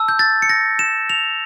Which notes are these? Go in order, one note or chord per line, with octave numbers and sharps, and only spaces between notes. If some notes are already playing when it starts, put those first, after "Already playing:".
Already playing: A5 E6
G6
A6
C#7
A#6
E7
F7